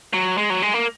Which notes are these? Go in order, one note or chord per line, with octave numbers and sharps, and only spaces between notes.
F#3
G#3
F#3
G#3
A#3